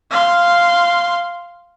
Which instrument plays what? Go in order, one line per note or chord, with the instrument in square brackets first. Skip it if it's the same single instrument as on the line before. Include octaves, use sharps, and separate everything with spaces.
[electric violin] F5 C6